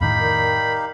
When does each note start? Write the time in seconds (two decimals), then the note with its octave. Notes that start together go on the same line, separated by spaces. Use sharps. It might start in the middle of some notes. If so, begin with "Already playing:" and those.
0.01 F2 A2 D#3 D#4 G4 F5 B5
0.20 A#4 D5